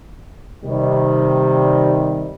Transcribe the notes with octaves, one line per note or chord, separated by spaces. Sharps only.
C3 D#3 G3